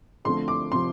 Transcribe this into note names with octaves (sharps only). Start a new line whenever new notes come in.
D3 F3 A3 C4 C6
D6
C3 F3 C6